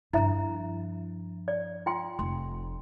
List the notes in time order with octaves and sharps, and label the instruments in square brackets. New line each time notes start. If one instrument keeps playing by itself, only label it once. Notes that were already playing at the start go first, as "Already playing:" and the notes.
[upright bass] G2 F3 [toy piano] E4 E5 A#5
[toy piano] D5
F4 G5 C6
[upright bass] F1 [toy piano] C6